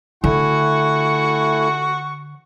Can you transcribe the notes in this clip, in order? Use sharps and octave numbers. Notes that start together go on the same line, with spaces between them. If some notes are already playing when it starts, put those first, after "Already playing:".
D3 A3 E4 F#5 G#5 C#6